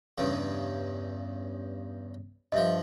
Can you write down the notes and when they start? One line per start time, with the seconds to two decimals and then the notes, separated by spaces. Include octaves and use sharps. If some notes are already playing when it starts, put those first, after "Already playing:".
0.18 E2 G2 C#3
2.52 G2 F3 D#5 E5